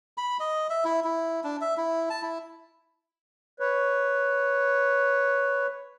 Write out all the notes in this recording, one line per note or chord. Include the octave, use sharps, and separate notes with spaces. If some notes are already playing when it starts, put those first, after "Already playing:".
B5
D#5
E5
E4
E4
D4
E5
E4
A5
E4
B4 C#5